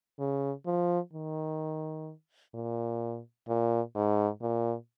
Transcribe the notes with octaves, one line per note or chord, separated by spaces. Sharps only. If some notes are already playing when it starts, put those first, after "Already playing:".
C#3
F3
D#3
A#2
A#2
G#2
A#2